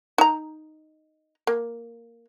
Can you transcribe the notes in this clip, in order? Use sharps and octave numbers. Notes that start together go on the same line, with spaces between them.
D#4 A#5
A#3